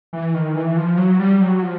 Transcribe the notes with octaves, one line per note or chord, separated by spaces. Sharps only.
E3
D#3
E3
F3
F#3
G3
F#3
F3